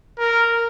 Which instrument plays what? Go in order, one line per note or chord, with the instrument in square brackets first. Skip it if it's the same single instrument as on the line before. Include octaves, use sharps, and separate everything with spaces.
[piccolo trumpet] A#4